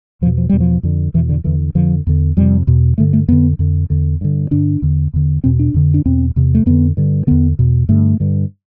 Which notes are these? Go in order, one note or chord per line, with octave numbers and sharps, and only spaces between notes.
E2 B2 F3
F3
E2 B2 G3
F3
F2 D3
E2 B2 E3
D3
E2 D3 E3
F2 D3 F3
E2 D3
F2 C3 G3
E2 B2
G2 D3 A3
A3
F2 D3 B3
F2 D3
E2 D3
G2 D3
G2 D3 D4
E2 D3
E2 D3
E2 B2 C4
D4
F2 D3
D4
E2 B2 C4
E2 C3
A3
F2 D3 B3
G2 D3
E2 D3 B3
E2 B2
G2 D3 A3
G2 D3